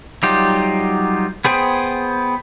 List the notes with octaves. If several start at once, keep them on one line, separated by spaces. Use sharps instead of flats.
F#3 G3 D#4 F4 G4
B3 G#4 C5 G5